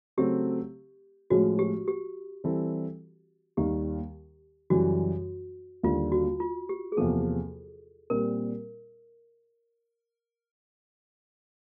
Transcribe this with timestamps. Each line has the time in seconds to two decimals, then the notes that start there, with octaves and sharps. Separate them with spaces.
0.17 C#3 F#3 A3 C4 G4
1.30 A2 F3 G#3 C#4 F4 F#4
1.59 G4
1.88 G4
2.44 E3 G3 C4 E4 A4
3.57 D#2 D#3 G3 G4
4.70 F#2 C#3 E3 G3 F#4
5.83 D#2 D3 G3 F4
6.12 F#4
6.40 F4
6.69 G4
6.92 G#4
6.97 E2 C3 F3 A#3 A4
8.10 A#2 G3 C4 A#4